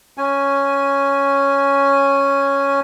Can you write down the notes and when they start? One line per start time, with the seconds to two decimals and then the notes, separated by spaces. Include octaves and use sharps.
0.18 C#4 G#5